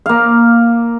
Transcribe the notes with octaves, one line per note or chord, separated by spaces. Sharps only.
A#3 F5